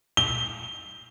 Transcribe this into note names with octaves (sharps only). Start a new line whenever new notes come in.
G7